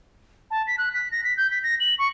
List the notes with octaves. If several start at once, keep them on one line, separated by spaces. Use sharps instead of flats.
A5
B6
F#6
B6
A#6
B6
G6
B6
A#6
F#7
C#6